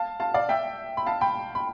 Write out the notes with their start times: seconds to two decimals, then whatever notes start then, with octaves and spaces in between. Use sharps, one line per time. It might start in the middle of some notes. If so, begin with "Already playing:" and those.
Already playing: F5 A5
0.20 F5 A5
0.34 D5 F5
0.49 E5 G5
0.97 B5
1.06 F5 A5
1.21 G5 B5
1.55 B5